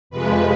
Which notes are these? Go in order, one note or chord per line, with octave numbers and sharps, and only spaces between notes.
F2 C3 F3 G#3 B4